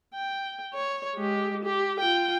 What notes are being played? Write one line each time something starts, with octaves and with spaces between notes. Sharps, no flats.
G5
C#5
G#3 G4
G4
F4 G5